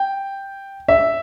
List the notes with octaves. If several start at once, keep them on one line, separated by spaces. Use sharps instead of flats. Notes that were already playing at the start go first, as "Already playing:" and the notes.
Already playing: G5
E5